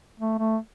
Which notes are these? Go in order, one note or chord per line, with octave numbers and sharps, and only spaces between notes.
A3
A3